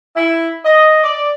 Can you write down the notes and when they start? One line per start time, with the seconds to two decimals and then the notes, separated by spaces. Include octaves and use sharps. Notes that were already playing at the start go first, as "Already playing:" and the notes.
0.16 E4
0.64 D#5
1.04 D5